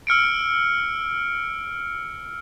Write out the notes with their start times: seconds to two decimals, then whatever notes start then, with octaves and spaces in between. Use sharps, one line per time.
0.07 E6 F6 C#7 D7